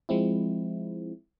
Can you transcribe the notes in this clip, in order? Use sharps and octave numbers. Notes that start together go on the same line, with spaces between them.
F3 G#3 C4 E4